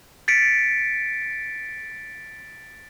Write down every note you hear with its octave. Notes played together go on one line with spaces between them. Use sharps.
A6 B6 C#7 D7